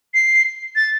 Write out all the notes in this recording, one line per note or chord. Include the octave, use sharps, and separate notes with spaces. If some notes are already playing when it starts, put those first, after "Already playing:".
C7
A6